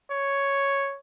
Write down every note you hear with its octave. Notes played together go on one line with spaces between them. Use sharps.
C#5